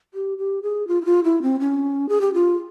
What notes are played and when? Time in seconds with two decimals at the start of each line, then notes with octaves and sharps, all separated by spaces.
0.14 G4
0.38 G4
0.63 G#4
0.88 F4
1.02 E4
1.05 F4
1.24 E4
1.42 C4
1.60 C#4
2.09 G#4
2.21 G4
2.34 F4